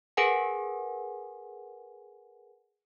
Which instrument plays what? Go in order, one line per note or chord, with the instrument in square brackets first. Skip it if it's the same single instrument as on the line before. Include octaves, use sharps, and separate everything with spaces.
[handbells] G#4 A#4 B4 F#5 G#5